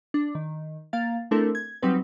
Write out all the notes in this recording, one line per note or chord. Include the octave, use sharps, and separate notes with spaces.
D4
D#3
A#3 F5 A6
A3 C4 D4 E4 A4 A#4
G#6
F#3 G3 C4 D#4 B4